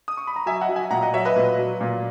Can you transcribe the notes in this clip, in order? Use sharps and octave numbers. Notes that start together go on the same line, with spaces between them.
D#6
C#6
B5
A#5
F#3 E5 G#5
D#5 F#5
F#3
E5 G#5
A#2 F#5 A#5
D#5 F#5
F#3 C#5 E5
B4 D#5
A#2
F#3
A#2